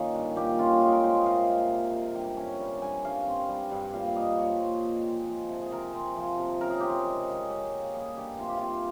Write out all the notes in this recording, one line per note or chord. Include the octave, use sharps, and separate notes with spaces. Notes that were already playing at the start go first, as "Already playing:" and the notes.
Already playing: D#3 A#3 C#4 F4
G2
A#2 G4
C#4 F4
G#3 F4
A#4
A#2 C5
D#5
C3 F5
A#3
G3
C3
G2 G5
C#4 G#5
G3
G2 G#5
G2 F5
C4
G3
G2
A#2 F5
F5
A#3 D#5
F3 C#5
A#2 C5
C4
G#3
F3
C3
G#4
C3 A#4
C4
F3
C3
C#3 A#4
G#4
C4 G4
G#4
G#3
C#3
C#4 G4
A#3
G3 G#4
G2 G4
C3 F4
G4
C4 F4